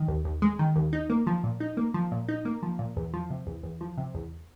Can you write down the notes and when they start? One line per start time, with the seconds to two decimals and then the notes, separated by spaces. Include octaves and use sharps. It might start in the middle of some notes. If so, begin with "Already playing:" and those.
Already playing: D#3
0.08 D#2
0.25 D#2
0.42 G#3
0.59 D#3
0.76 D#2
0.93 D#4
1.10 A#3
1.27 F3
1.44 A#2
1.60 D#4
1.77 A#3
1.94 F3
2.12 A#2
2.29 D#4
2.45 A#3
2.63 F3
2.79 A#2
2.97 E2
3.14 F3
3.30 C3
3.47 E2
3.63 E2
3.81 F3
3.98 C3
4.15 E2